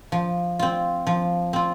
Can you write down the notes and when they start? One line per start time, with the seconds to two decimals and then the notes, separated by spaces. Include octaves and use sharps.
0.12 F3
0.59 C4 F4
1.07 F3
1.53 C4 F4